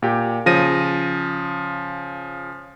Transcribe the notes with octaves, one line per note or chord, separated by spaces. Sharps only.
A#2 G4
C#3 F3 A#6 D#7